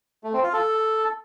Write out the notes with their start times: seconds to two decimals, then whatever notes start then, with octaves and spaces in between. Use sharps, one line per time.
0.24 A3
0.33 C4
0.43 F4
0.53 A4